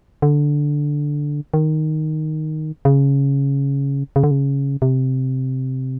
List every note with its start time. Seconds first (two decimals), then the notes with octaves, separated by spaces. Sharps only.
0.22 D3
1.54 D#3
2.85 C#3
4.16 C#3
4.24 D3
4.31 C#3
4.82 C3